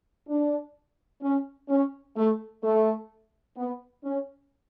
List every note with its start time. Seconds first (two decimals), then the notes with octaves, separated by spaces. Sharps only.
0.29 D4
1.23 C#4
1.70 C#4
2.17 A3
2.63 A3
3.57 B3
4.04 C#4